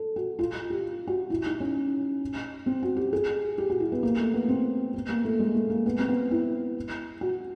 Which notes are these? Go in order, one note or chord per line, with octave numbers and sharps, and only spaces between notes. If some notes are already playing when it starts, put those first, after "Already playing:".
Already playing: A4
F#4
F4
G4
F#4
E4
D#4
C#4
C4
F#4
G4
G#4
G4
F#4
E4
B3
A#3
A3
B3
C4
B3
A#3
A3
G#3
A3
A#3
B3
C4
B3
E4
F#4